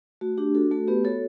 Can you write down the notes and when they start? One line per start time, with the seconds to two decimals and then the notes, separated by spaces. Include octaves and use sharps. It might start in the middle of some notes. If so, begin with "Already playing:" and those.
0.21 A3 F#4
0.38 D4 G4
0.55 F#4 A4
0.71 A3 F#4 A4
0.88 B3 G4 B4
1.05 F#4 A4 C#5